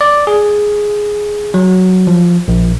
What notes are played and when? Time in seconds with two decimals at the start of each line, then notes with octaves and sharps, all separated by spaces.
0.01 D5
0.27 G#4
1.54 F#3
2.07 F3
2.48 A#1